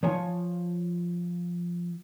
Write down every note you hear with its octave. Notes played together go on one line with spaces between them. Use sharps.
F3 C#5 G#5